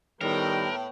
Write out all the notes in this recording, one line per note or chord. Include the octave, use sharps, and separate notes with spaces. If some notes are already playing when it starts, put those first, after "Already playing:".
A2 D#3 G3 B3 A#4 G5